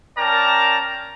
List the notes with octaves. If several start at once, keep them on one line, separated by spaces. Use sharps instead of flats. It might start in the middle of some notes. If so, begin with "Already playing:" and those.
C#4 A#4 D5 G5 A5 A#5